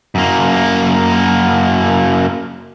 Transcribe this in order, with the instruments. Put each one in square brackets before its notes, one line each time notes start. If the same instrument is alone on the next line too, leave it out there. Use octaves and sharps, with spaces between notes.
[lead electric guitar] F#2 A#3